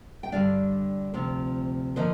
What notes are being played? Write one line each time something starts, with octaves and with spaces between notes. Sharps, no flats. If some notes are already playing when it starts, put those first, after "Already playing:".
G5
G2 D3 G3 D4 D5 F5
D2 C3 F3 C4 F4
D3 F3 A#3 C5 D#5